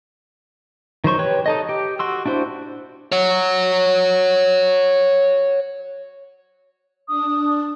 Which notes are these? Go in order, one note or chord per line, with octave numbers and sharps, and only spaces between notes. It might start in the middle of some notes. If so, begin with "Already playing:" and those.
D#3 F#3 C5 C#6
G4 B4 C#5
D#4 A4 D#5
G4
F#4 C6 E6
D4 E4 F#4 C5
C#5 F#5
D4 D#6